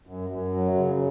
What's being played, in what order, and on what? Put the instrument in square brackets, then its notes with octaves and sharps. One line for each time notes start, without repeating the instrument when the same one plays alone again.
[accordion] F#2
F#2
F#3
C#3